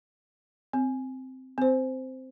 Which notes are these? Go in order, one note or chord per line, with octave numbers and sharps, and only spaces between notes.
C4
C4 C5